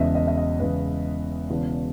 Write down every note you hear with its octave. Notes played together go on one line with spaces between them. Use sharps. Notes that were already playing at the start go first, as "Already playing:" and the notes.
Already playing: E1 E2 C#3 D#5 E5
D#5
E5
D#5
E1 E2 C#3 B4
E1 E2 C#3